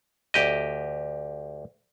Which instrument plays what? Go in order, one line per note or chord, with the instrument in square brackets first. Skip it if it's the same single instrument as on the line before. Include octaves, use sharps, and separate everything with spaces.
[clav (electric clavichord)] D2 G4 D#5